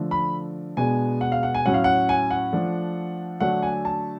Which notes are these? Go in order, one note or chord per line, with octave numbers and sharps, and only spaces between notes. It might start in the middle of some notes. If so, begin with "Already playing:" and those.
Already playing: D3 F3 A3
B5
B2 G#3 B3 D4 G#5
F#5
F5
F#5
G#5
A2 F#3 C#4 F#5
F5
F#5
G#5
F#5
F3 A3 D4
D3 F#3 A3 D4 F#5
G#5
A5